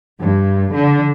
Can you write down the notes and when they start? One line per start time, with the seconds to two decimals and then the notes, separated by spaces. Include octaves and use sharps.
0.21 G2
0.72 D3